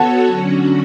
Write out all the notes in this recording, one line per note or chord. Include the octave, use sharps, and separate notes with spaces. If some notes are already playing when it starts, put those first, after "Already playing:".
Already playing: B3 F#4 A4 C#5 F#5 A5
D3 F#3 C#4 F#4